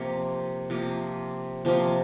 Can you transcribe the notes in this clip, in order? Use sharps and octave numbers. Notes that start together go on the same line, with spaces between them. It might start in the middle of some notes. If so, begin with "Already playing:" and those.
Already playing: C3 F3 A#3 A#4 C#5
C3 F3 A#3
C3 F3 A#3